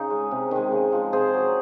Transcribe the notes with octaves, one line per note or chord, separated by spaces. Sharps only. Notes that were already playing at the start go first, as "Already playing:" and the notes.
Already playing: C#3 D#4
G#3
C3
D#3 G#3
C#3
F3 G#3
C3 G#4 C5
F#3